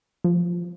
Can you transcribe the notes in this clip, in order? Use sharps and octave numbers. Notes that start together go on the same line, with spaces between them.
F3